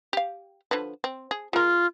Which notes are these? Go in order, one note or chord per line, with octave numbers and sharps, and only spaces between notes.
G4 F5
D3 F3 B4
C4
G#4
G#3 F4 A#4